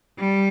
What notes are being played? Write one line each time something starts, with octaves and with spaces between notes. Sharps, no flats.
G3